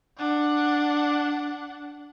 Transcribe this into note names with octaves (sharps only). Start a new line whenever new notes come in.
D4 F#5